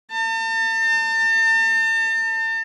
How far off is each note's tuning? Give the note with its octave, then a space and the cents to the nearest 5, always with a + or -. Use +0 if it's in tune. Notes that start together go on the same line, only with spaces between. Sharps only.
A5 +40